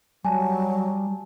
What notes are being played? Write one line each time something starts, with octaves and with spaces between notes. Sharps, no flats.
F#3 G3 G#5 A5